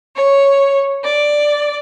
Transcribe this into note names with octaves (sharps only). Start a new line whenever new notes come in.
C#5
D5